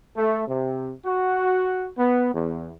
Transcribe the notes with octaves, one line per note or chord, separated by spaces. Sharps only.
A3
C3
F#4
B3
E2